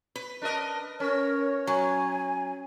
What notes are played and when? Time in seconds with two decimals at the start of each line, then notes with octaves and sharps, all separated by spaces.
0.16 B4
0.42 D4 A#4 D#5
1.00 C#4 A#4 C#5
1.67 F#3 G#5